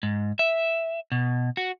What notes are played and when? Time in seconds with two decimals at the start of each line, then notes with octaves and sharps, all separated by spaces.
0.03 G#2
0.39 E5
1.12 B2
1.57 F#4